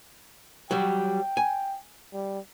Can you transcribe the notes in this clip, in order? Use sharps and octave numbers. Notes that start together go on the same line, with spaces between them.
F#3 G3 G5
G#5
G3